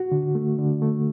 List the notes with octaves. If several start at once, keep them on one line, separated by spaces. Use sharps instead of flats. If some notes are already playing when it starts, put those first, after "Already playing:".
Already playing: F#4
D3
A3
D3
A3